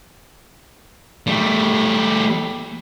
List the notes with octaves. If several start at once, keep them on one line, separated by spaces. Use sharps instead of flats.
G3 A3